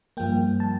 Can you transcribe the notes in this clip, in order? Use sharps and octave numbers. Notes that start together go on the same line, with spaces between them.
G2 F3 A#3 G5
A5